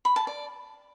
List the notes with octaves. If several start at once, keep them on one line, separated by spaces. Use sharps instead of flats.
B5
A5
D5